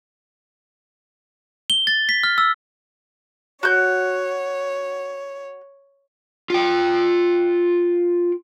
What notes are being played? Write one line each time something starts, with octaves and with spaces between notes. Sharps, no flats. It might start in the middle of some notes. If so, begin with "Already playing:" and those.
G7
A6
B6
F6
E6
F#4 C#5 G6
F4 G5